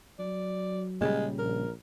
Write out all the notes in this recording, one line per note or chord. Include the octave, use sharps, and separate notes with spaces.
F#3 D5
A#2 C#3 G3 G#3
A#1 A#4